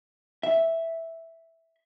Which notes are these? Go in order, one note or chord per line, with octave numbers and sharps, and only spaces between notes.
E5